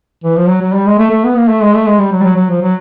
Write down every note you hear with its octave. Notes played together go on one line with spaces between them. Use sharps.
E3
F3
F#3
F#3
G3
G#3
A3
A3
B3
A#3
A3
G#3
A3
G#3
G3
F#3
G3
F#3
F#3
F3
F#3